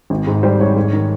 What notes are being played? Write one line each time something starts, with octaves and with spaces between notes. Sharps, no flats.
G#1
G#2
G3 C5
G#2 C#5
G#2
D#3